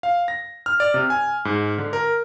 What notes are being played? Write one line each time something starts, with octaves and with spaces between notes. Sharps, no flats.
F5
A#6
F6
D5
C3
G#5
G#2
D3
A#4